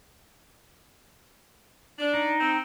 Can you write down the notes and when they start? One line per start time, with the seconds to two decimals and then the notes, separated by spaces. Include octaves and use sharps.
1.99 D4
2.14 D#4
2.40 C4